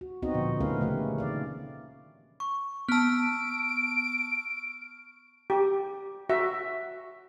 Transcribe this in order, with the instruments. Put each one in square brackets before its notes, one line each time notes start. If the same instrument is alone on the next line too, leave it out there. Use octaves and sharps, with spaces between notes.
[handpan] F#4
B3 C4 D#4 F#4 D#5
A#2 D3 F3
A3 C#4 D#4 A#4 B4 F5
C#3 E3 A3 A#3 G4
D#3 D5 F5
[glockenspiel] C#6
[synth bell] B3 A5 [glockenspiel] E6 F6 [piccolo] D7
[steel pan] G4
F#4 E5